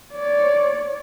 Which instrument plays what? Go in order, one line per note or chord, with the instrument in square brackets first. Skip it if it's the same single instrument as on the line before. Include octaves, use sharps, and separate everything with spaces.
[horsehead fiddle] C#5 D5